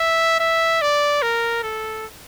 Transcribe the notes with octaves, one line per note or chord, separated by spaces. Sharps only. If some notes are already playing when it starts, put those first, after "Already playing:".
Already playing: E5
E5
D5
A#4
A4